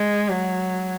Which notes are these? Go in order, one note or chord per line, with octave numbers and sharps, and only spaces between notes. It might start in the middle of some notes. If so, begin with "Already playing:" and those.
Already playing: G#3
F#3